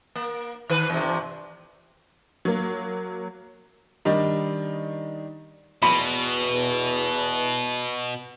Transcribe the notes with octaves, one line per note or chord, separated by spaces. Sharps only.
A#3
D#3 B4
E2 G2 C3
F#3 A#3
D#3 G3 D4 D#4
E2 B2 B5